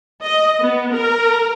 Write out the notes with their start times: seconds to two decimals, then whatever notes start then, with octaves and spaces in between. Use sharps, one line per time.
0.24 D#5
0.62 B3
0.93 A#4